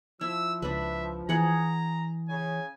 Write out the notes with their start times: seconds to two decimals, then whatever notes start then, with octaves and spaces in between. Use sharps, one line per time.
0.21 F3 E4 E6
0.62 C#2 D4 B4 E5
1.29 E3 G#4 F#5 A#5
2.29 C#3 G#5